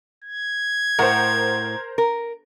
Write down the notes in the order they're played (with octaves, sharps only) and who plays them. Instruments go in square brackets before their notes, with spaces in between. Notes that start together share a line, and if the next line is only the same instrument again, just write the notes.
[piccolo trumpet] G#6
[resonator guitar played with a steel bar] A2 F#5 [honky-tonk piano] A#4 C5
[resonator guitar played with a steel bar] A#4